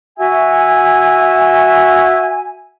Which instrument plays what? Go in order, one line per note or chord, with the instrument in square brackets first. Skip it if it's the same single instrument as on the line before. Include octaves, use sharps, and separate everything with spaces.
[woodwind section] F#4 E5 G#5